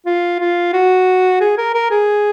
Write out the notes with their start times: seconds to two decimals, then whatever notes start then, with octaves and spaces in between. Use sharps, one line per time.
0.06 F4
0.40 F4
0.73 F#4
1.41 G#4
1.58 A#4
1.74 A#4
1.91 G#4